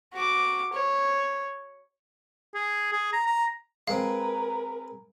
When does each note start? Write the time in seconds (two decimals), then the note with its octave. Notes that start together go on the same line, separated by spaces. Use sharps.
0.13 F#4 D6
0.73 C#5
2.55 G#4
2.92 G#4
3.13 A#5
3.26 A#5
3.87 G#3 C4 A#4 B4 F5